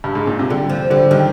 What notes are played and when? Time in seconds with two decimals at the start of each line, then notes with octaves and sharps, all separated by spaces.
0.04 G2
0.15 G#2
0.27 A#2
0.39 C3
0.50 D3 G3
0.69 F3
0.90 D3 G3
1.11 D#3 G3